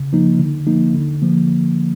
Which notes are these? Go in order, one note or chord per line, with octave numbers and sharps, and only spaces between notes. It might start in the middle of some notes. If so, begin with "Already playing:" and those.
Already playing: C#3
F3 A#3 D#4
D3
F3 A#3 D#4
D3
F3 A#3